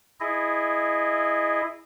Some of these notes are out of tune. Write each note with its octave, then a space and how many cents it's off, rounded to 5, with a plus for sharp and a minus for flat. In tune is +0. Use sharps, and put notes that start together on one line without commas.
E4 +0 G#4 +0 D#5 -20